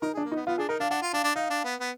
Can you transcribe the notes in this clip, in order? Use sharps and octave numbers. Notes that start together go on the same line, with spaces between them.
D#4 A#4
G#4
D4
A#3
D#4
B3
B3 F4
D4 G#4
D#4 A#4
D4 F5
D4 F#5
F4
D4 F5
D4
D#4 F5
D4
B3
B3